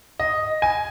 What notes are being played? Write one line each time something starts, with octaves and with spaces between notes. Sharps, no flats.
D#5
G#5